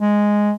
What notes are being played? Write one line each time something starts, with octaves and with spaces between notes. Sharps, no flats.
G#3